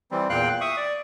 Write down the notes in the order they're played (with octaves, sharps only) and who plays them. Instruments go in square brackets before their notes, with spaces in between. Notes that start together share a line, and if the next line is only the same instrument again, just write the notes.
[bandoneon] E3 G3 C4
E2 A#2 F5 G5 F#6
E5 C#6 D#6
D5